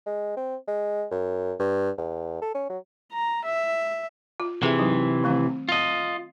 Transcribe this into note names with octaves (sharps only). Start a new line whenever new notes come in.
G#3
C4
G#3
F#2
G2
E2
A4
C#4
F#3
A#5
E5
F4
C3 E3 G#4 E5
F#3 D#4
D#3 A3 C4
F4 D#5